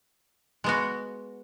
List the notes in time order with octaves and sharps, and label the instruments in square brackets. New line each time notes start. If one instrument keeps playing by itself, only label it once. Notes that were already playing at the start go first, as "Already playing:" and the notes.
[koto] G#3 B3 F#4